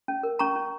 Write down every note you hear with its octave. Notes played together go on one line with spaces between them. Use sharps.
C#4
A#4
C#4 A#5 C#6
C#4